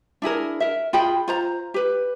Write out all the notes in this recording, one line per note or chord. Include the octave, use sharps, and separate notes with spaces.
D4 E4 G#4 A#4
A#4 E5
F4 G#4 G5 B5
F4 C5 A#5
G4 B4